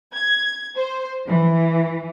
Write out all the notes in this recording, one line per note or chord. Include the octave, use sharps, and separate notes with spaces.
G#6
C5
E3